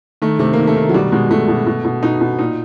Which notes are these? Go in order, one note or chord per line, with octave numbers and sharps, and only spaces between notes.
D#3 A3
C3 A3
D#3 A#3
A3
D#3
F#3
B2 G3
B2 G#3
B2 A3
B2
B2
B2
B2 D#4
B2
A#2 D#4